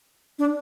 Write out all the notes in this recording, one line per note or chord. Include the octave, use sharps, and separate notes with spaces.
D4